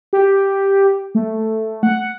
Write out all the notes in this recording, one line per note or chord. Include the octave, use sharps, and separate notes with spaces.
G4
A3
F#5